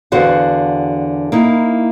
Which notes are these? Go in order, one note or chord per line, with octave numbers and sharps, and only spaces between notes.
E2 D3 F#4 C5 F5 F#5
A#3 D#4 E4